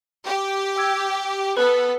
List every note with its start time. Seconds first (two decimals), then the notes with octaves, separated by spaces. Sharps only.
0.25 G4
0.76 G5 E6 G#6
1.57 B3 A4 B4 B5 F#6